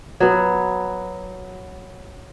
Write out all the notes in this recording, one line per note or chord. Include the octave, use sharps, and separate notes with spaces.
F#3 B3